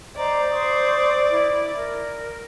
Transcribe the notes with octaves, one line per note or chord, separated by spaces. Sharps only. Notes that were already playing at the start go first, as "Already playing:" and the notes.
C5 D5 D#5 A#5
C5 C#6 D#6
E4
A#4